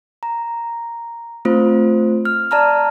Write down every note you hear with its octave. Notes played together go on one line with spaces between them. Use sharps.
A#5
A3 C4 F4 C5
F6
D5 A5 A#5 F6